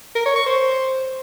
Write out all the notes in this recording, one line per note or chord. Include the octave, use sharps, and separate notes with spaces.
A#4
C#5
C#6
C5